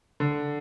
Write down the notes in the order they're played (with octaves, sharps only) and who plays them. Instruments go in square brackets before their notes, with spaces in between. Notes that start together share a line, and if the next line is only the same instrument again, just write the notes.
[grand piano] D3